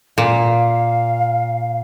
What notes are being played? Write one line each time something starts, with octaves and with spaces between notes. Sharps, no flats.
A#2 F5